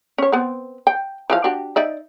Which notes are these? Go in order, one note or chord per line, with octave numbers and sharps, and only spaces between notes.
C#4 C#5
B3 C4
G5
E3 F3 F5
D4 F#4 G4
D#4 D5 E5